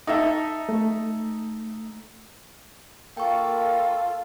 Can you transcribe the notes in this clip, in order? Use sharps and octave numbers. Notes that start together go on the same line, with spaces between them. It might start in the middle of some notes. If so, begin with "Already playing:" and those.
D#4 A4 E5
A3
A#3 F4 A4 G5 C#6